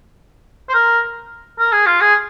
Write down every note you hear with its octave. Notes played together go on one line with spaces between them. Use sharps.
C5
A#4
A#4
G#4
F4
G#4